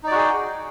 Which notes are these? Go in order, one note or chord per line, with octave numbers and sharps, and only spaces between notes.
D#4 F#4 G#4 D5 G5